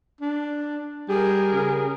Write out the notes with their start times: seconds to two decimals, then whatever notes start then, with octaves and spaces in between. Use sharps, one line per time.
0.21 D4
1.09 G3 G#4 A#4
1.54 C#3